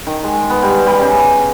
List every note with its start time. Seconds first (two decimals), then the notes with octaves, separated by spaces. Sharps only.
0.07 D#3
0.24 G#3
0.50 B3
0.62 G3
0.86 G3
1.00 C#3